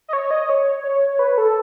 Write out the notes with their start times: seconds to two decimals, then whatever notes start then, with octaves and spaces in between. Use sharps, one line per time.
0.08 D#5
0.13 C#5
0.31 D#5
0.49 C#5
0.84 C#5
1.19 B4
1.38 A4